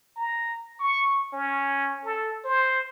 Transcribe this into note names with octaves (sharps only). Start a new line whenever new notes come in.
A#5
C#6
C#4
A4
C5